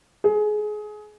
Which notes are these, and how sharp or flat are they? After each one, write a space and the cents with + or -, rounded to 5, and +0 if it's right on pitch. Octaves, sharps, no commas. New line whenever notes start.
G#4 +25